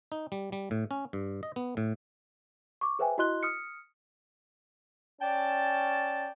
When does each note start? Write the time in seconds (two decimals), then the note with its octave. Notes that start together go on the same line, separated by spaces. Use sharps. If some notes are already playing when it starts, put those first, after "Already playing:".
0.12 D#4
0.32 G3
0.52 G3
0.71 A2
0.91 C#4
1.13 G2
1.43 D#5
1.56 B3
1.77 A2
2.81 C#6 D6
2.99 G#4 B4 C5 E5 G5 G#5
3.18 E4 F#4 D#5 C6 F#6 G7
3.43 D#6 F6 C#7
5.22 C#4 D5 G5 A5